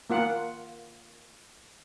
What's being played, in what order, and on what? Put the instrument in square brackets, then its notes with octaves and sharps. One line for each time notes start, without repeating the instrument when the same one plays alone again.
[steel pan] A#3 F4 F#5